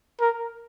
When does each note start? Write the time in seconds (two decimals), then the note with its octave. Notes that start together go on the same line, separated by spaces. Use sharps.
0.21 A#4